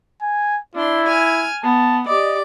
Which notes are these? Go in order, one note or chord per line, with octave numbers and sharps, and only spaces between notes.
G#5
D4 E4 C6
G#5 F6 G#6
B3 A5
G4 D5 D#5 D6